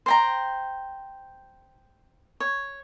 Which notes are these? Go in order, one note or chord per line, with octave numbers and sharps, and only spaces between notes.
C5 G5 A#5
C#5